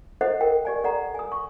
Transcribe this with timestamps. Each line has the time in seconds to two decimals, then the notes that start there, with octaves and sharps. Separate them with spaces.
0.21 A4 C5 D#5 F#5
0.41 A#4 G5
0.65 G4 D5 G#5
0.84 A4 D5 F#5 A#5
1.15 G#5 D#6
1.32 C#6